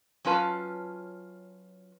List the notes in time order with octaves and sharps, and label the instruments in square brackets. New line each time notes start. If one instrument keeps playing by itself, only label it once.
[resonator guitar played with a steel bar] F#3 C#4 F4 B4 A5